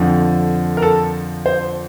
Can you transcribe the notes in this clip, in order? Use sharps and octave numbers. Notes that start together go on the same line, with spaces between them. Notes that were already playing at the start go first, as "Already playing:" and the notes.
Already playing: F2 D3 F3
A#4
A4
C5